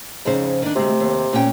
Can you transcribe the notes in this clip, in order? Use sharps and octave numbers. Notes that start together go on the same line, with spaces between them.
F2 G#2 C#3 C5
D#3 D4
D2 C3 G#3
D#2
A#2 C#4 G5